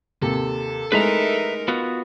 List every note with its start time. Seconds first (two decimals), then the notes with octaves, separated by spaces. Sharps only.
0.22 D#2 C3 A4
0.92 G#3 A3 D#4 E4 A#4 B4 E5 A#5
1.68 B3 F4 F#4